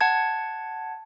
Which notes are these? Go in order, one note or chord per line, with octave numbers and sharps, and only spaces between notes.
F#5 A5 G#6